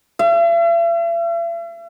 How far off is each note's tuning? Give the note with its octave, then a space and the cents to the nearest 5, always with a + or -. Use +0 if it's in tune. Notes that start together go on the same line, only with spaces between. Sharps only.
E5 +45